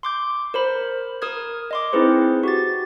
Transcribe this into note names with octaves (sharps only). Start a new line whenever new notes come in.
C6 D6 G6
A#4 C5 B5
A#4 D#6 F6 G#6
D#5 C6 D6
C4 D#4 E4 G#4 B4 C5
F#4 G4 A6